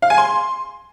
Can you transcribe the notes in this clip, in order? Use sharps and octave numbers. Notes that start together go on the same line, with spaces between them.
F5
G#5
C6